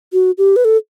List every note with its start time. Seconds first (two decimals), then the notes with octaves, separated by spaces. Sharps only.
0.13 F#4
0.38 G4
0.56 B4
0.65 A4